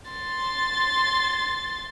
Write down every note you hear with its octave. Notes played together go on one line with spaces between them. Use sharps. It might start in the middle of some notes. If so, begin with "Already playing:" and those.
C6 A6